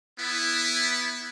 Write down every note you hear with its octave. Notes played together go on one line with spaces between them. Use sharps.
B3 E4